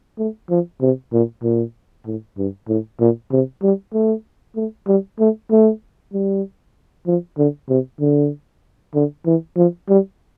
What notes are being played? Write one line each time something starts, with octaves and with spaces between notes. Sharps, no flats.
A3
F3
C3
A#2
A#2
A2
G2
A2
A#2
C3
G3
A3
A3
G3
A3
A3
G3
F3
D3
C3
D3
D3
E3
F3
G3